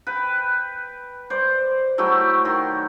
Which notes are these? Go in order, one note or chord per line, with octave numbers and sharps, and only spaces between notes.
B4 G5
C5 D5
F#3 A3 E4 G4
D#3 C6